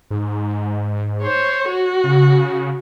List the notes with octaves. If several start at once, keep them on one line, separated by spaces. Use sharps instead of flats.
G#2
C5 C#5
F#4
C#3